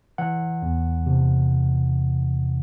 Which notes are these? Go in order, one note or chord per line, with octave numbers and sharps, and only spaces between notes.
E3 F#5
E2
C3